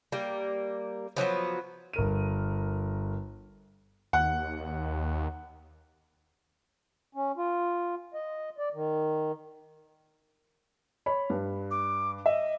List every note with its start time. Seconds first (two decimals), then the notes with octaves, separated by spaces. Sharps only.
0.12 G3 A#3
1.17 F3 F#3 A#3 B3
1.93 G1 A#4 D#7
4.13 D#2 F#5
7.15 C#4
7.37 F4
8.14 D#5
8.58 D5
8.74 D#3
11.06 C#5 B5
11.30 G2
11.71 D6
12.26 D#5 E5